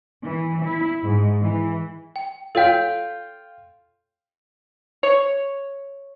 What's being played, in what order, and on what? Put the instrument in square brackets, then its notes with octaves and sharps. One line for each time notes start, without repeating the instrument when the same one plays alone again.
[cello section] E3
E4
G#2
E3
[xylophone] G5
[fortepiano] F4 G5 [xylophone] A4 C#5 F5
[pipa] C#5